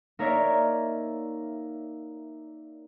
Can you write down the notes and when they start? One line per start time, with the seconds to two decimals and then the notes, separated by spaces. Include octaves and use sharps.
0.19 A#3 D#4 A#4 C#5 D5 E5